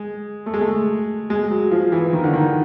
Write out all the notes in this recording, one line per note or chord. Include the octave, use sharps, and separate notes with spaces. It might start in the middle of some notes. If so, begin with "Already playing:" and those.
Already playing: G#3
A3
G#3
A3
G#3
F#3
F3
E3
D#3
D3
D#3